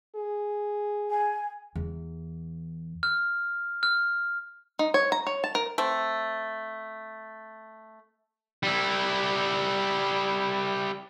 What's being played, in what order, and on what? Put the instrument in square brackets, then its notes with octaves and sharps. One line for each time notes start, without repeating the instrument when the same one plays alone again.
[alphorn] G#4
[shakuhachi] G#5
[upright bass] E2
[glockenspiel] F6
F6
[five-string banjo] D#4
C#5
A#5
C#5
A5
A#4
[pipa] A3 C4
[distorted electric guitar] G3 E4